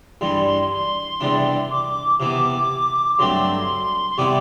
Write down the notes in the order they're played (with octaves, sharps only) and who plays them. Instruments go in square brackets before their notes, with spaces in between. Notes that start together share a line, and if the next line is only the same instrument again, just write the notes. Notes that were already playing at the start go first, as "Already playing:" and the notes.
[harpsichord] G2 E3 G3 [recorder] C6
[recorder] C6
C6
[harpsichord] E2 C3 G3 D4
[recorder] D6
[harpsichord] C3 E3 B3 [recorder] D6
[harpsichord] G2 F#3 A3 C4 [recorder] C6
[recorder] C6
[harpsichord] C3 G3 B3 E4 G4 [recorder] D6